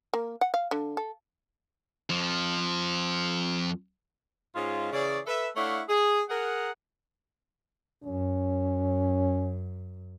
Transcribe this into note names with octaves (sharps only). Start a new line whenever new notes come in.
A#3
F#5
F5
D3
A4
F2 F3
G#2 G#3 C#4 F4
C#3 E3 G#4 C#5 D5
A4 B4 E5
A3 D4 E4 C#5 F5 F#5
G#4
G#4 A#4 F#5
F#2 C#4